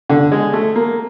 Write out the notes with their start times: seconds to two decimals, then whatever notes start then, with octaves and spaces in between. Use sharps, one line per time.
0.10 D3
0.32 G#3
0.53 A3
0.75 A#3